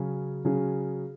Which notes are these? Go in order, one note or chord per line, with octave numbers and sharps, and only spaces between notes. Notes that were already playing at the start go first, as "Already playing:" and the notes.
Already playing: C#3 F#3 C#4 G#4
C#3 F#3 C#4 G#4